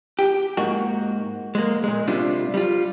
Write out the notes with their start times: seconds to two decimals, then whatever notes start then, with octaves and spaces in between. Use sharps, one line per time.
0.19 G4
0.57 G#2 A#3 F#4
1.55 G#3 A#3
1.84 A#2 G#3
2.07 C3 G3 D4 F4
2.54 G3 F4